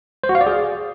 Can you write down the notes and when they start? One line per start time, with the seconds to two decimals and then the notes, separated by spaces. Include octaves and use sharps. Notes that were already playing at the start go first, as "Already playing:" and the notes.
0.24 C5
0.29 F#4
0.35 F5
0.41 D5
0.47 G#4